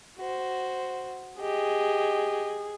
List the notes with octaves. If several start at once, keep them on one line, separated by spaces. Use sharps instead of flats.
F#4 C5
G4 G#4 D#5